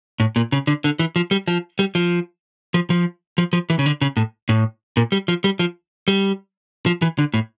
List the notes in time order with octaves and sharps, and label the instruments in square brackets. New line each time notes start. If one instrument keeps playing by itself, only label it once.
[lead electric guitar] A2
A#2
C#3
D3
D3
E3
F3
G3
F3
G3
F3
F3
F3
F3
F3
E3
C#3
D3
C#3
A2
A2
A#2
G3
F3
G3
F3
G3
F3
E3
D3
A2